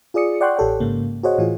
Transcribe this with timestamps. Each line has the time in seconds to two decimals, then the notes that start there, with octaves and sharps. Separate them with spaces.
0.14 F4 G#4 D5 D#6 C#7
0.41 D5 F#5 G5 C6 C#6 F#6
0.57 A1 G4 A4 C#5 G5
0.80 G#2 C#3 A#3
1.23 F#4 G#4 C5 C#5 D#5 F#5
1.38 A2 E3 F4 G#4